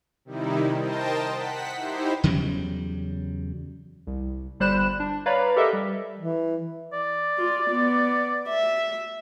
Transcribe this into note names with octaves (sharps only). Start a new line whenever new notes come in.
C3 D#3 G3 D#4 E4
A#4 C5 D#5 G5 A5
F#5 B6
D#4 E4 G4 C5
E2 C#3 F#3 G3
C2
G1 G3 C5 B5 F#6 E7
D4
B4 C#5 D5 F5 A#5 B5
G4 A4 A#4 D#5 E5
G3
E3
D5
F4
B3
E5